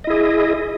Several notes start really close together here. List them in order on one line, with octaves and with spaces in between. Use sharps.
D#5 E4 G#4